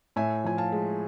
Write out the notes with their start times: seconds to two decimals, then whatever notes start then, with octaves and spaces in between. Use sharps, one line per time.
0.16 A2 E5 G#5
0.44 F3 G#5
0.58 F5 A5
0.72 G#3